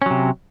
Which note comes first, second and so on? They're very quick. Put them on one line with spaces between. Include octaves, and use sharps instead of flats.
C#4 F#3 C3